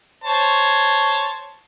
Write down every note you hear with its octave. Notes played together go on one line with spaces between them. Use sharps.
C5 C#5 A5